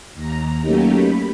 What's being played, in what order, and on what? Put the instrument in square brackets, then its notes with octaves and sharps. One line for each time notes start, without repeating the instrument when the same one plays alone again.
[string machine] D#2 A#5
F#3 A3 A#3 C#4 D#4 G4
B5